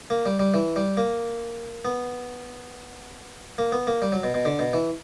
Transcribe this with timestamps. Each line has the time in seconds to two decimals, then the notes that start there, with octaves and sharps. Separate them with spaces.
0.10 A#3
0.26 G3
0.39 G3
0.54 E3
0.76 G3
0.97 A#3
1.85 B3
3.58 A#3
3.72 B3
3.87 A#3
4.02 G3
4.12 F#3
4.23 B2
4.34 B2
4.45 D3
4.59 B2
4.73 E3